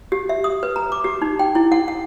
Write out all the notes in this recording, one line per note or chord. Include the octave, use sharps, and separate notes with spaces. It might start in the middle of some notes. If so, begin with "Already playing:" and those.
G4
E5
D#6
B4
A#5
D6
G4
D#4
G5
E4
F#5
F#5